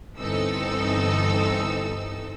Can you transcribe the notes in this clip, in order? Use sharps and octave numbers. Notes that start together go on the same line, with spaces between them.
G1 E3 C4 D#4 A4 E6